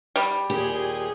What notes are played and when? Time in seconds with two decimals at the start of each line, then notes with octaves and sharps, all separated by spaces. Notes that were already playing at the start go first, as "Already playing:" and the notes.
0.16 G3
0.50 D#2 A#2 G4 G#4